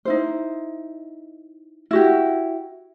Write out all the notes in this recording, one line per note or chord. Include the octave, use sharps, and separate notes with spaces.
D#4 E4 C5
E4 F#4 G4